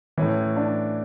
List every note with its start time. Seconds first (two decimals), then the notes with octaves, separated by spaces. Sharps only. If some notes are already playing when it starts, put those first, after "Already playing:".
0.18 A2 E3 C#4
0.57 D4